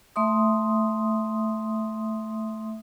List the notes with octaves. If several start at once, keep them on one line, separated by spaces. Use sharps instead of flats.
A3 E5 C6 D#6